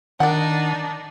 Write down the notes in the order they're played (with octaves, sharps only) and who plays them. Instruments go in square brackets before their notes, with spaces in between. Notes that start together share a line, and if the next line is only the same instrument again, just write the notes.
[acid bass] D#3 [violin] D4 D#4 [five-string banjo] D5 F#5